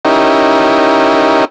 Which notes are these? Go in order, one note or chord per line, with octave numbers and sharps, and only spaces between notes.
C#4 D#4 E4 G4 A#4